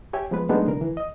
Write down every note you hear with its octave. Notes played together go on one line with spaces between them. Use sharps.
G4 C#5 E5 G5 G#5
F3 G#3 B3 B4
F#3 G#3 A3 B3 D4 D#4
C2 D3 A#4
E3
D#5